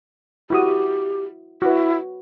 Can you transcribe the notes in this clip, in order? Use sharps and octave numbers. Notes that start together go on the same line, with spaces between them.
E4 F#4 G4 D#6
E4 F#4 B4